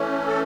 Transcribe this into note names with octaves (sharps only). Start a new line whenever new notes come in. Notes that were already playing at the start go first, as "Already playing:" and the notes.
Already playing: E3 A3 C#4
A4